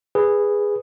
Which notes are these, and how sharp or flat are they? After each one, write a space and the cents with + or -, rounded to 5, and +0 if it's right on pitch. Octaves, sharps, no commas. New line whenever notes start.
G#4 -10 B4 +0